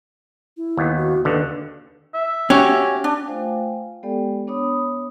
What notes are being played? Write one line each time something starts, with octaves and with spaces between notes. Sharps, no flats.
E4
D#2 B3
F#4
D#2 D3 B4
E5
C#4 F#4 G4 C#5
D4
A3 F4 C5 F5 G5 G#5
G#3 B3 G4 A4 D5 G5
B3 D4 C#5 B5 D#6